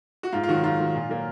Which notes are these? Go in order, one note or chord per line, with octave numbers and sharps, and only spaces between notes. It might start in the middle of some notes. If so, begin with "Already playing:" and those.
F#4
G#2 F4
F4
D#3 F#3 F#4
G#2 F4
D#3 F#3
A#2
F#3 A#3